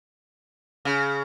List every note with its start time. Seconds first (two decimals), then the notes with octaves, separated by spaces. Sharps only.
0.85 C#3